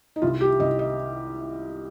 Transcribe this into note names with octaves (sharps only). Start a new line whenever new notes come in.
D#4
C2 F4
G4
C2 D#5
D#5